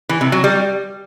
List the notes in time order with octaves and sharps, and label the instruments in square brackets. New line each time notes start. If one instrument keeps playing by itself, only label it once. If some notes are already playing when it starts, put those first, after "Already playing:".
[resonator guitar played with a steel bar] E3
C3
F#3
G3